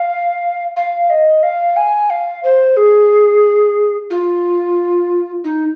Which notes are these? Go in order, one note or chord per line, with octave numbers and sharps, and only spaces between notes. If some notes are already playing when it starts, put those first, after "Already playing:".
Already playing: F5
F5
D#5
F5
G#5
F5
C5
G#4
F4
D#4